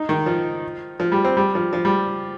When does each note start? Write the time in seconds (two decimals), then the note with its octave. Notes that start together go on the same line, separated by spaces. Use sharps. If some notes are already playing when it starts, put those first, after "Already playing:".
Already playing: D#4
0.09 D#3
0.26 F3
1.00 F3
1.12 G3
1.24 C4
1.37 G3
1.55 F3
1.73 F3
1.85 G3